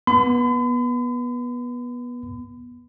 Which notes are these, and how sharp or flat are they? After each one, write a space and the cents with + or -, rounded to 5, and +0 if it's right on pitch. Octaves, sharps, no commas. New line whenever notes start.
B3 -20 B5 +45